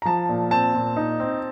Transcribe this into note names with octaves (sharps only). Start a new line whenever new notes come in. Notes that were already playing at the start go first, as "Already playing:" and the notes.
A#5
F3 A5
A#2
C4 A5
A#2
D#4
C4